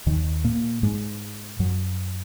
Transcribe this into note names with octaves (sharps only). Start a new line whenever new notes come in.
D#2 D#3
A#2 A#3
G#2 G#3
F#2 F#3